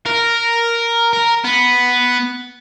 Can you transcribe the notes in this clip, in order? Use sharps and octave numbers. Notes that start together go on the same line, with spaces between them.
A#4
A#4
B3